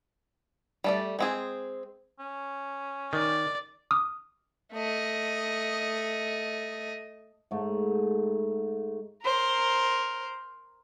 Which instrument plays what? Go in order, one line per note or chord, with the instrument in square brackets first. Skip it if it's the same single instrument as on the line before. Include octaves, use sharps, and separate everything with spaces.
[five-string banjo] G3 A3 D5
G#3 C4 G#4
[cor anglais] C#4
[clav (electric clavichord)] D#3 [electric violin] D5
[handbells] D6 D#6 F6
[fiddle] A3 D#5
[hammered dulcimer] G#2 A3
[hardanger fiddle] A#4 C5